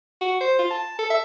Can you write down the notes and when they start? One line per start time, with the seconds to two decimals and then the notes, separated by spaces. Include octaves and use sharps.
0.21 F#4
0.41 C5
0.59 F4
0.71 A5
0.99 A4
1.10 E5